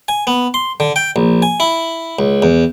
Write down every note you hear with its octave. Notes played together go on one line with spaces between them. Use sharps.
G#5
B3
C6
D3
G5
A#1
G#5
E4
C#2
E2